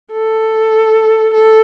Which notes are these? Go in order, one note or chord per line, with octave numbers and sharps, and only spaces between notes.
A4
A4